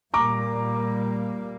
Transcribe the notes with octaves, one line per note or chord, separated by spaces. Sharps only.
A#2 G3 A#3 A#5 D6